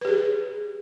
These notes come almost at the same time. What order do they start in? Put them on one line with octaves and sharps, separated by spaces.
B4 G4 G#4